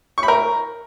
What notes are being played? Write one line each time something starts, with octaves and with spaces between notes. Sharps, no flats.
C#6
B5
A#4